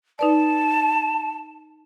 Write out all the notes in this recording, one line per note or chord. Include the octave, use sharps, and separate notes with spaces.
D#4 B4 D5 A5